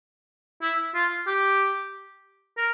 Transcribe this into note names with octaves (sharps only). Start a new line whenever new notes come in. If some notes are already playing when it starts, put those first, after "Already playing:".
E4
F4
G4
A#4